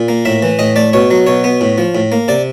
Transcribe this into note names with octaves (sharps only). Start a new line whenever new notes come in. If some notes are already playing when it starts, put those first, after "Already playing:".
Already playing: A#2
A#3
A2 E5
E3
A2 D#5
A3 D5
B2 C#5
F#3
B2 C#5
B3
A2
F3
A2
A#3
C3 D5